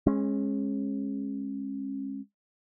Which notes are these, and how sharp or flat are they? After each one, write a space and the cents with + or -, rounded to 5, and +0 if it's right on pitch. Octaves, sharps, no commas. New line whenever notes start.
G#3 +0 C#4 -30